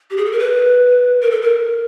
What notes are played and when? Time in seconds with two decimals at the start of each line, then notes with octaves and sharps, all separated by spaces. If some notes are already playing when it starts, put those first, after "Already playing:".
0.11 G4
0.17 G#4
0.25 A4
0.32 A#4
0.39 B4
1.21 A#4
1.31 A4
1.42 A#4